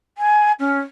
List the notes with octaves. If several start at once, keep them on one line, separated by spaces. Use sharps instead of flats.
G#5
C#4